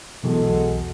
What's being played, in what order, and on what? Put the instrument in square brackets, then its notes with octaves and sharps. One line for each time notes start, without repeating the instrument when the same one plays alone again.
[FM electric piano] B1 E2 [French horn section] G#3 F#4 A4